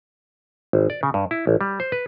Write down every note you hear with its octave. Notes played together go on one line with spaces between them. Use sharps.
G#1
D5
C#3
G2
E4
A1
G3
C5
B4